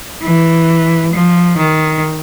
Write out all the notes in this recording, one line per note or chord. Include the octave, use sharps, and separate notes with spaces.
E3
F3
D#3